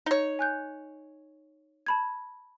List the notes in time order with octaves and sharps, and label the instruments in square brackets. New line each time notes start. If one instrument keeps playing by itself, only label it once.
[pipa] D#4 C#5
[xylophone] G#5 F#6 G6
A5 B5 G#6